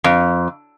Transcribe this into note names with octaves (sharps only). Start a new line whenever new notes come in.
F2